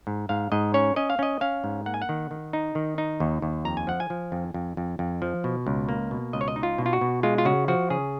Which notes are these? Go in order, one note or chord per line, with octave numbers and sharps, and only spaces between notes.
G#2
G#2 F5
G#2 D#5
C#4 C#5
C#4 D#5
F5
C#4 D#5
C#4 F5
G#2
A#3 F#5
G#5
F#5
D#3
D#3
D#4
D#3
D#4
D#2
D#2
F2 A#5
G#5
F3 F#5
G#5
F3
F2
F2
F2
F2
F3
B2
C#2
A#3
B2
C#2 D#5
C#5
D#5
D#4
F4
B2
F4
F#4
B2
G#3 F4
F4
C#3 F#4
F3 F#4
C#3 G#4